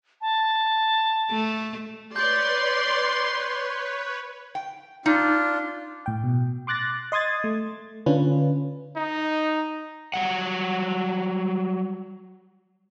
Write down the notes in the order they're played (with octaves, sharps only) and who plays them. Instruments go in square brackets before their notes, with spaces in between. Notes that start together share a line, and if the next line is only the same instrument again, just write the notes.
[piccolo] A5
[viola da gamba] A3
[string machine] B4 C#5 [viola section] D5 [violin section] C6 [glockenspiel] G6
[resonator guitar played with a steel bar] G5
[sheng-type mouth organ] D4 F4 [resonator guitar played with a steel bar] D#4
[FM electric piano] A2 G5
B2
C6 D6 F#6 A6 A#6
D#5 C6 D#6 G#6 A6
A3
D3 C#4 D4 F4 B4
[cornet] D#4
[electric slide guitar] F#3 G3 F#5